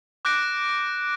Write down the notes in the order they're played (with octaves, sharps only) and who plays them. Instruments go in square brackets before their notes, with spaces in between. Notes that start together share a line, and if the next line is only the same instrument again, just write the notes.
[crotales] D6 F#6 G6 A#6 D7